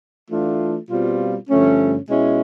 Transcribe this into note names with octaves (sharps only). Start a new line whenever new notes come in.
E3 A3 D4 F4
B2 G3 C4 F4
G2 D3 F3 A3 C#4
B2 G#3 C#4 E4